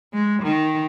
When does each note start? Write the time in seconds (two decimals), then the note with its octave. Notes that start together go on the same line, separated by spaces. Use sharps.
0.14 G#3
0.43 D#3